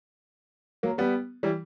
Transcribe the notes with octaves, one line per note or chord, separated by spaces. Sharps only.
F#3 A#3
G3 B3
E3 G3